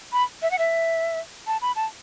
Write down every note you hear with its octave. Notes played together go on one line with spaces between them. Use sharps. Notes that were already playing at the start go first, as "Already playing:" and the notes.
B5
E5
F#5
E5
A5
B5
A5